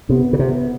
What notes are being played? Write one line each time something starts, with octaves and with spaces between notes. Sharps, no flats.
C3 B3
C#3
C3